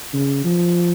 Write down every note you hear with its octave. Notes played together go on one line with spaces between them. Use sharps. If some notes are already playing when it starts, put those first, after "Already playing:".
C#3
F3